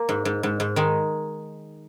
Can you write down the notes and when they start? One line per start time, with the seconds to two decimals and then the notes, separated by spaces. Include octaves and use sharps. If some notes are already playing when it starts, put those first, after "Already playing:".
Already playing: A#3
0.09 G#2
0.25 G#2
0.43 G#2
0.60 G#2
0.76 D#3 G#3